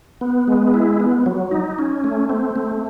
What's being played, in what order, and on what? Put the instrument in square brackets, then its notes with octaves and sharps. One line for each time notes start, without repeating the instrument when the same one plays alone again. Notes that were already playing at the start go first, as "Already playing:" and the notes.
[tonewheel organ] B3
G#3
E4
B3
F#3
D#4
C#4
A3
C4
A3